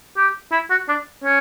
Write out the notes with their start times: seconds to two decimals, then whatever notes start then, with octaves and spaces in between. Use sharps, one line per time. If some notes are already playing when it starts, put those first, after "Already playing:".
0.17 G4
0.52 E4
0.70 F#4
0.89 D4
1.24 C#4